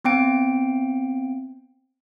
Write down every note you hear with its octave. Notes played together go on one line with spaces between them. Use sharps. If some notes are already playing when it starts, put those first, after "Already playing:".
B3 C4 G5 D7